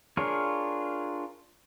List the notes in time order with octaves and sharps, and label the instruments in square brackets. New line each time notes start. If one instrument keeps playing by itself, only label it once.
[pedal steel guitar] D4 F4 G#4 A#4 C#5